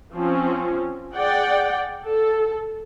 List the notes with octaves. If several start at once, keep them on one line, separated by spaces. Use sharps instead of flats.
F3 C4 C#4
G#4 D5 F#5 G5
A4